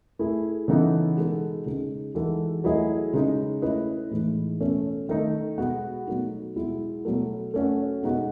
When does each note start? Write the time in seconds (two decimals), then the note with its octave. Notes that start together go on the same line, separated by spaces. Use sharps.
0.19 A3 E4 G#4
0.68 C#3 E3 B3 D#4 A4
1.17 B2 G#3 D#4 F#4 A4
1.66 C#3 G#3 D#4 G#4
2.15 E3 G#3 D#4 F#4 A4
2.64 F#3 A3 E4 G#4 D#5
3.13 C#3 G#3 D#4
3.62 A3 C#4 E4 B4 D#5
4.11 A2 E3 G#3 D#4
4.60 B2 A3 C#4
5.09 D#3 A3 D#4
5.58 B2 G#3 B3 F#4
6.07 B2 F#3 A3 D#4
6.56 B2 G#3 B3 E4
7.05 B2 F#3 A3
7.54 A3 C#4 F#4
8.02 B2 G#3 D#4 F#4